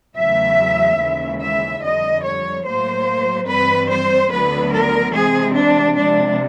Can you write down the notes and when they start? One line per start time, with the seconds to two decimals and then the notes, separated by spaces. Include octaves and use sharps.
0.16 E2 C#3 F#3 A3 E5
1.00 D#2 C#3 E3 G#3
1.41 E5
1.82 F2 D3 G3 D#5
2.24 C#5
2.65 A2 F#3 A#3 C5
3.48 G2 E3 G3 C4 B4
3.89 C5
4.31 D2 D3 F#3 B3 B4
4.72 A#4
5.14 C3 E3 G#3 C4 G#4
5.55 D4
5.96 C3 F3 G#3 D4